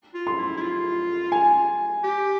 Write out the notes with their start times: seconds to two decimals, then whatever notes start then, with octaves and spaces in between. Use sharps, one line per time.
0.14 F4
0.27 C6
0.38 E4
0.57 E4
0.61 F4
1.32 G#5
2.03 G4